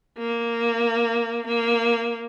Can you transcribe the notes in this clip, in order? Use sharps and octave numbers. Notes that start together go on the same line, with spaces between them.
A#3
A#3